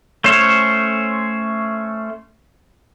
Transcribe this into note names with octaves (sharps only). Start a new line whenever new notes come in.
A3 C#4 C5 C#5